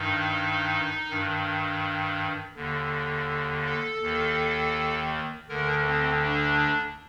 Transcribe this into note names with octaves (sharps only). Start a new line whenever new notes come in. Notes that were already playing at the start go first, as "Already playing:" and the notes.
Already playing: G2 D#3 D#4
G2 D#3
D#2 D3
A4
D#2 D#3
D2 D3 A#4
C4
D4